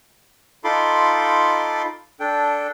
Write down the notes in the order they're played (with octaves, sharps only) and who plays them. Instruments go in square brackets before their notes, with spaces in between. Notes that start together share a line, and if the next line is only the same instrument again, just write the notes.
[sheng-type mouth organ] D#4 F4 A4 B5 C6 D6
D4 A4 G5